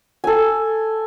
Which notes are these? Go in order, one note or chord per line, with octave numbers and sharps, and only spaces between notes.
A4 G#5